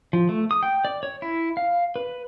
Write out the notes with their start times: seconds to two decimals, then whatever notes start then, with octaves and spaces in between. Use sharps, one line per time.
0.13 F3
0.29 A3
0.51 D#6
0.63 G5
0.85 D5
1.03 C#5
1.22 E4
1.57 F5
1.96 B4